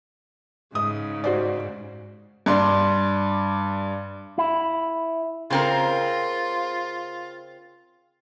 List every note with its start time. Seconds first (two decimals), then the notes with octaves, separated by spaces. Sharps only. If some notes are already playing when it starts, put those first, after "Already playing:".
0.75 G#2 C#3 D#6
1.24 F#4 C5 D5
2.46 G2 D5 C6
4.38 E4
5.50 C#3 C4 F4 A#4